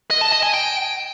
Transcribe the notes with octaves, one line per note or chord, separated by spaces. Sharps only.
D#5
A5
D#5
G#5
G5